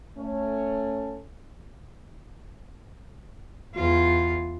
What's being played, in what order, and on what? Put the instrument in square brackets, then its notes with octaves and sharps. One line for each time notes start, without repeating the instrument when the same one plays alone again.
[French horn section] A3 C#4
[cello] E2 F4